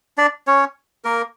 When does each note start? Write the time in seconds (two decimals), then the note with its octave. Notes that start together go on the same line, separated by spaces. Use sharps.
0.18 D4 D5
0.47 C#4 C#5
1.04 A#3 A#4